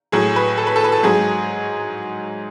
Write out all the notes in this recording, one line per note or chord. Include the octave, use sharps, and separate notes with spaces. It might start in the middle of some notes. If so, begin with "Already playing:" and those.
A2 F#3 G#4
B4
A4
B4
A4
B4
A4
G#2 F#3 G#4